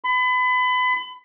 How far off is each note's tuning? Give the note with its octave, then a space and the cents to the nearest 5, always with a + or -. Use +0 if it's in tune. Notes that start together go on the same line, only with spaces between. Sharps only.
B5 +30